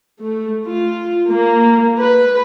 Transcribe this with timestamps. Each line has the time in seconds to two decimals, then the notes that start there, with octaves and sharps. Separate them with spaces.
0.21 A3
0.66 F4
1.29 A#3
2.00 B4